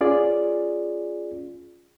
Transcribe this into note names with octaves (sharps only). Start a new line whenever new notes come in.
C#4 F4 G#4 D5